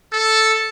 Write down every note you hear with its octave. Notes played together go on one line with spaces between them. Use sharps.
A4